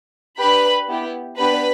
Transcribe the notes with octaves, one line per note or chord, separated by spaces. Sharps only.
D4 G4 B4 B5
B3 E4 G4
B3 D4 G4 B4 B5